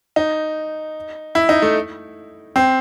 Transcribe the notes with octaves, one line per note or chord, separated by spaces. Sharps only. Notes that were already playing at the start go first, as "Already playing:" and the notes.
D#4
E4
D#4
A3
C4